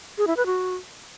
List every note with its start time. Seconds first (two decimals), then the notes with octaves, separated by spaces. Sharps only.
0.18 G#4
0.27 E4
0.37 B4
0.46 F#4